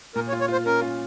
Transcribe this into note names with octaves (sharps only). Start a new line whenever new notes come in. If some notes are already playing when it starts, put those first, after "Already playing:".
A#2 A#4
C#5
F4
C#5
F4 C5
C#4 A#4
F4